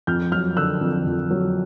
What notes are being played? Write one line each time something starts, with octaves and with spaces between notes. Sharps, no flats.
F2 F6 G6
F#3 F6 G6
D3 E6 F#6
F2
F2
F#3